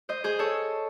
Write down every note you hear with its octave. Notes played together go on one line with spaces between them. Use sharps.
C5 D#5
G#4 C5
A4 C#5